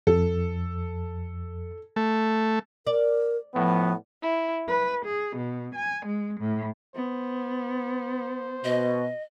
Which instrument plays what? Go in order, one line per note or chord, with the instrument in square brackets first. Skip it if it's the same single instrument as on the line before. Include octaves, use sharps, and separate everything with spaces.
[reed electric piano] F2 [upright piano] A4
[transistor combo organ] A3
[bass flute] A#4 [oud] D5
[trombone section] A2 B3 [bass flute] F3
[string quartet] E4
B4
G#4
B2
G#5
G#3
A2
[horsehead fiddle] B3 [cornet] C5
[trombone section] B2 [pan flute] D#5